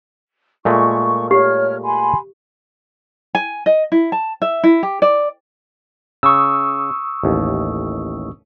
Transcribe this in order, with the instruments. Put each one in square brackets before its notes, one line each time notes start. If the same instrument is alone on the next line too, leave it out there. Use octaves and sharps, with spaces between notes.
[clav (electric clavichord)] A#2 G#3 A3 [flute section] F4 C#6
[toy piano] G4 [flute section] C#5 F6
[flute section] G#5 B5 C6
[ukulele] G#5
D#5
E4
A5
E5
E4
G4
D5
[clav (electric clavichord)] C#3 [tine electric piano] C#6 D#6 E6
[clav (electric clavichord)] A1 D#2